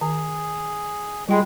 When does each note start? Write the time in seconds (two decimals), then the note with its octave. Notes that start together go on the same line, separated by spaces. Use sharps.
0.01 D#3 G#4
1.28 G3 G#3 F4 G5 B5